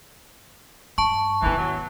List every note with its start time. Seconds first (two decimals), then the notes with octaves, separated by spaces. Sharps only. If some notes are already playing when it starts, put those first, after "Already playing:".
0.98 G2 A5 C#6
1.42 D#3 E3 B3
1.58 F#3